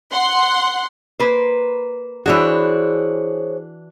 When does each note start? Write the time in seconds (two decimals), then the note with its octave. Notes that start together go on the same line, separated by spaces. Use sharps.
0.12 F#5 C6
1.20 A#3 B4 C5
2.26 E3 D4 F#4 G#4 C5 C#5